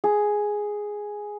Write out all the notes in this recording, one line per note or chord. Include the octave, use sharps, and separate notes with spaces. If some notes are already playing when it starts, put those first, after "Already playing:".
G#4